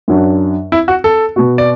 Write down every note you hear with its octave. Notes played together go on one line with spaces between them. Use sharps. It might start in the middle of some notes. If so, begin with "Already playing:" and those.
F#2 F#3 D4
E4
F#4
A4
B2 B3 F#4
D5